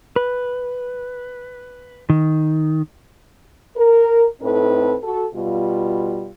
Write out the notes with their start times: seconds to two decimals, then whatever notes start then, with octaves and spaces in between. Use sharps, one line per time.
0.16 B4
2.10 D#3
3.76 A#4
4.42 A2 C4 D#4 A4 B4
5.03 F#4 A4
5.35 B2 G3 F4